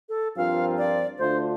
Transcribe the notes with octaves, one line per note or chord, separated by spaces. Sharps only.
A4
G2 F3 C4 F4 A#4 F5
D5
D2 D3 A3 D4 F4 C5